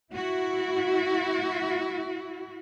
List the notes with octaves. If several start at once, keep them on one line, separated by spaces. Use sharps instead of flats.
E4 F#4